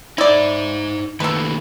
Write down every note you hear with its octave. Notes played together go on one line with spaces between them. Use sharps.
D#4 E4 C5 D5
D#3 A3 A#3 A4 B4